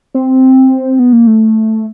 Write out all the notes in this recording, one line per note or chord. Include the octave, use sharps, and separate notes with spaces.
C4
B3
A#3
A3